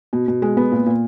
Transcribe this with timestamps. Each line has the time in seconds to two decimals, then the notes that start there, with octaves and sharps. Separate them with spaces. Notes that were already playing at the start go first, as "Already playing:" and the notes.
0.13 B2
0.28 B2
0.42 G#3
0.57 B3
0.72 A#2
0.86 A#2